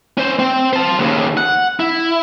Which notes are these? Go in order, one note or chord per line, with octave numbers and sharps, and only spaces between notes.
C#4 C5
C4 G5
C5 A5
D#2 C#3
F#5
E4